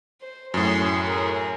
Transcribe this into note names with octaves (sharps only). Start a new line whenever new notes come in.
C5
F#2 A2 G#4 C6
G#4 A#4